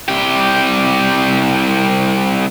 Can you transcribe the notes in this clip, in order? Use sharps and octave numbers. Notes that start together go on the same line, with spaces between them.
C2 G4